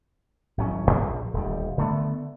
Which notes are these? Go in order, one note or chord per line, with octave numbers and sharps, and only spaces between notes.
G#1 A2 F#3 C#4
D#1 A#1
D#1 D2 G3
D3 A3 B3